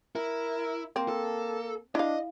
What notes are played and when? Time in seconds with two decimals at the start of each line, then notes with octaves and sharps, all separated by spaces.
0.15 E4 A#4
0.96 A#3 C4
1.08 A4
1.95 D4 E4 D#5 F5